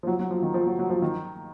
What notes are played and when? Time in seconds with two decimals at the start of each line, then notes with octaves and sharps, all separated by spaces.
0.03 F3
0.07 F#3
0.19 F#3
0.31 F3
0.43 D#3
0.54 F3
0.66 F#3
0.79 F#3
0.90 F3
1.02 D#3